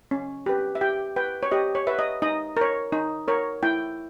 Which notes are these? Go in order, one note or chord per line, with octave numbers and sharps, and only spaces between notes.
C#4
G4 B4
E5
G4 G5
B4 G5
C#5
G4 D#5
C#5
B4 E5
D#5
D#4 D#5
A#4 C#5
D#4
A#4 C#5
E4 G5